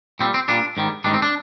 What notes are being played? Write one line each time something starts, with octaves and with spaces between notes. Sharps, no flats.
A#2 G3 C4
C4
A#2 G3 D4
G#2 D#3 G3
G#2 D#3 G3 D4
C4
D4